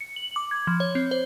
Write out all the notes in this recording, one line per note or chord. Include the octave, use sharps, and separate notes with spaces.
C#7
F#7
D6
G#6
F3
C#5
C4
C5